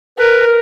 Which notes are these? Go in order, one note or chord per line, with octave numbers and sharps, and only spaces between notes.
A#4 B4
A#4